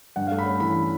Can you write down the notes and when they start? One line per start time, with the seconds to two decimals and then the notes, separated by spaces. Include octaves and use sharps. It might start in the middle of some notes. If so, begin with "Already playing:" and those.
0.16 G2 F#5
0.27 A3 F5
0.39 B5
0.46 C#4
0.60 E3 B5